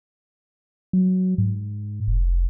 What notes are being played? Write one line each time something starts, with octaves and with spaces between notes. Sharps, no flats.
F#3
G#2
F1